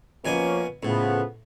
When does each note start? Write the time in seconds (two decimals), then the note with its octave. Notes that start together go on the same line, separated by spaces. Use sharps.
0.25 B2 F3 A#3 C#4 G#5
0.83 A2 C#3 F3 B3